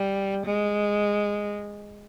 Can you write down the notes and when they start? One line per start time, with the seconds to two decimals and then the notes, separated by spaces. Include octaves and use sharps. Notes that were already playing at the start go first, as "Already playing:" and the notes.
Already playing: G3
0.46 G#3